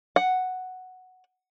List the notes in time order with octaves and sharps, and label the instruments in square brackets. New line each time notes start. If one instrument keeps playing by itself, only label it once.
[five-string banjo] F#5